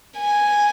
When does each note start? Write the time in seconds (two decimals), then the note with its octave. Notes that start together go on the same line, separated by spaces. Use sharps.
0.19 G#5